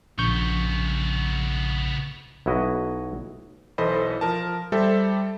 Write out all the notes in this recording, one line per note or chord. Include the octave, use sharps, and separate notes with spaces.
A#1 C#3 B3 C#6 G6
B1 E4 F#4 D#5
B1 E3 A4 C5 D#5 B5
F3 A#4 A5
G3 G4 A4 C5 E5